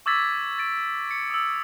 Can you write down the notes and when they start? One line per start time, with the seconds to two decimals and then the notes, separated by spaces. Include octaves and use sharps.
0.06 C#6 D6 E6 G#6 A6 B6
0.59 A6 D7
1.11 C#7
1.30 D#6 E6